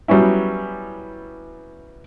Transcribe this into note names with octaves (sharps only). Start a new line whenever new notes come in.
F#3 G3 B3 C#4 E4